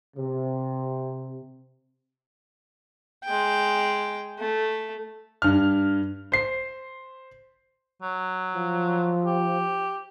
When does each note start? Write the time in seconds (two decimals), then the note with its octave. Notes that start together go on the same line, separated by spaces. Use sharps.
0.16 C3
3.24 G#3 G5
4.39 A3
5.42 G2 F6
6.32 C5 C7
8.02 F#3
8.55 F3
9.25 G4